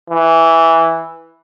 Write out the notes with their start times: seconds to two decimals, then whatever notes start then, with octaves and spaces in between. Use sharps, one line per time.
0.10 E3